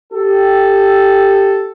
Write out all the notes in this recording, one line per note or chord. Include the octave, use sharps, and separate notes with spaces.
G4 A4